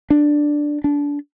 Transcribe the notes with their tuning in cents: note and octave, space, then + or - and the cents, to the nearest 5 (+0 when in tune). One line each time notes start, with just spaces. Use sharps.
D4 +5
D4 -25